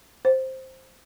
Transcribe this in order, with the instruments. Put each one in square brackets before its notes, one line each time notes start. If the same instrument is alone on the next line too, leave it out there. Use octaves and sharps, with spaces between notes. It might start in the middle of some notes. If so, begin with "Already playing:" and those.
[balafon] C5